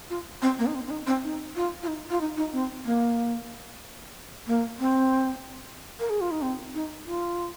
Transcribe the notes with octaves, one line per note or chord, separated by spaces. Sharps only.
F4
C4
A#3
D#4
C4
C4
D#4
C4
D#4
F4
F4
D#4
F4
D#4
D#4
C4
A#3
A#3
C4
A#4
G#4
F4
D#4
C4
D#4
F4